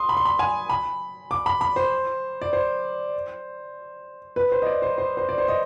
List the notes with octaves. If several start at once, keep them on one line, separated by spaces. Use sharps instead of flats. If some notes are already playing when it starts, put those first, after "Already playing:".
Already playing: C6 D#6
B5
C6
B5
G#5
B5
D6
B5
B5
C5
D5
C5
B4
C5
D#5
D5
C5
C5
C5
D5
C5
D#5